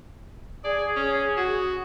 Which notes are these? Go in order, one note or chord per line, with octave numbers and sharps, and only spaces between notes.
G#4 D5
C#4
F#4